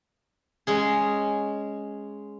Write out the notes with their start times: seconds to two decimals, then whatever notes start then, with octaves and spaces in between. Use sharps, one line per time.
0.67 G#3 C#4 G#4